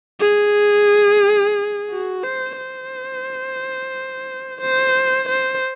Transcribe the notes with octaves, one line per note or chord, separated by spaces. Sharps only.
G#4
F#4
C5
C5
C5
C5